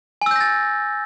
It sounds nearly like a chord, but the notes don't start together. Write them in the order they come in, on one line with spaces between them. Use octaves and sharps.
G#5 E6 G6 A#6 A6